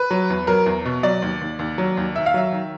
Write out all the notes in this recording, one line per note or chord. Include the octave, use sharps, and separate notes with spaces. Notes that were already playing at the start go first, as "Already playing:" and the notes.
Already playing: B4
F#3
E2
F#3 A#4
E2
B2
F#3 D5
D#2
D#2
D#2
F#3
D#2
D#3 E5
F5
F#3 E5
D#3